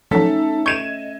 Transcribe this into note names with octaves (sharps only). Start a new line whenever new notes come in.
F3 F#3 A3 C#4 D#4 A4 B6
D#5 C#6 G6 G#6 C#7 D#7 E7